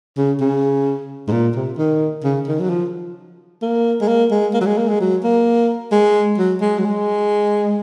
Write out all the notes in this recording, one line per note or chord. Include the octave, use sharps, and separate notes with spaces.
C#3
C#3
G#2
A#2
C3
D#3
C#3
D#3
F#3
F3
A#3
G#3
A#3
G#3
A#3
F#3
G#3
A#3
G#3
F#3
A#3
G#3
F#3
G#3
F#3
G#3